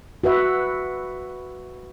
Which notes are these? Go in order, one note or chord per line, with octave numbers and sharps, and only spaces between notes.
F#4 B4 E5